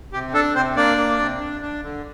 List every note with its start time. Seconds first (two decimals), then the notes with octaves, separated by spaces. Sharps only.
0.13 C3 G4
0.34 D4 A4
0.55 C3 C4 C5
0.76 A#3 D4 D5
0.98 A#3
1.19 C3
1.40 D4
1.61 D4
1.82 D3